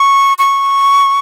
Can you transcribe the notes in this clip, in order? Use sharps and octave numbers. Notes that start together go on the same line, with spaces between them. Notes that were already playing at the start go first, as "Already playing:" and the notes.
Already playing: C#6
C#6